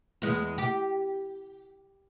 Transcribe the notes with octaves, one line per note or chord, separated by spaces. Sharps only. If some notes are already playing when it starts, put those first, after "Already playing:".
E2 G#3
G4